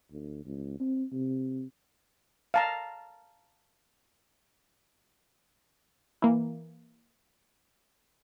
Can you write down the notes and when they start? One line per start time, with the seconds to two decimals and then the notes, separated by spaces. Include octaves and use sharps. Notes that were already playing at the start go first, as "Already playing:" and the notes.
0.12 D2
0.46 C#2
0.80 C4
1.12 C3
2.54 F5 A5 A#5
6.22 E3 A#3